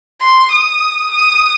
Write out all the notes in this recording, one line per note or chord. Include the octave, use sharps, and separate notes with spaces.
C6
D#6
D#6